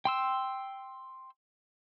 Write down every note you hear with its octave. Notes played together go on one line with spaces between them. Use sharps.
G5 C6 E6